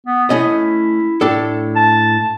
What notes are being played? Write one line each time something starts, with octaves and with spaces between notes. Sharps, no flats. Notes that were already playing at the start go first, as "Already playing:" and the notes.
B3
A3 C#4 E4 D#5
A2 D4 A4
A5